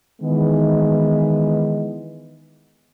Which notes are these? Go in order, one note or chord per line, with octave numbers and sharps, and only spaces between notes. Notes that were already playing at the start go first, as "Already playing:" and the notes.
D#3 E3 G#3 B3